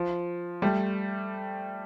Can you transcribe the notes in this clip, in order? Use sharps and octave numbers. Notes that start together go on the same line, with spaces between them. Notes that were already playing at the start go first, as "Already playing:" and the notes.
Already playing: F3
G3 A3